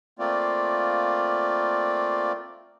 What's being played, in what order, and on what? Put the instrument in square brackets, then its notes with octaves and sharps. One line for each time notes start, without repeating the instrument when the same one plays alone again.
[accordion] A3 A#3 C4 F4 D5